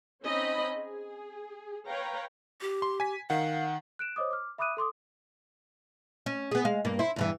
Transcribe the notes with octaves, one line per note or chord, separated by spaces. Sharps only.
C4 C#4 D#4 D#5 B5
G#4
B4 C#5 F5 G5 A#5
G4
C6
G#5 B6
D#3 F5 F#5
F#6 D7 E7
C5 C#5 D#5 D6 D#6
D6 F6
E5 B5 D6 D#6 F#6 D#7
A4 C6 D6 D#6
C#4
B3 G#4
G#3 F5
G2 A#3
E4 C5
E2 G2 E3